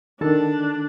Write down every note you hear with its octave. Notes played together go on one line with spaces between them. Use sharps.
D#3 D4 A4 A5